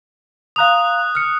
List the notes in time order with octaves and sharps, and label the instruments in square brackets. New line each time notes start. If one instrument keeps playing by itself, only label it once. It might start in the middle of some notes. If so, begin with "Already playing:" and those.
[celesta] F5 A#5 F7 [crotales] D#6 F#6
[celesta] F6 C#7